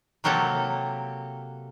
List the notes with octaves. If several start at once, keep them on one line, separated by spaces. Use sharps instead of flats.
C3 F#3 A#3 G4 A4